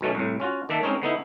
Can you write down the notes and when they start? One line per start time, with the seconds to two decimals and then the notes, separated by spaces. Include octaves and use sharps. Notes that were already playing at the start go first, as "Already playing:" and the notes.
0.01 B1 B2 A3 C#4
0.15 C2 A2
0.40 C#4 F4 F#4
0.69 D#3 A#3 D4 E5 A5
0.83 G#3 C4 C#4 D#4 A#4 C#5
1.02 D3 B3 D#4 E4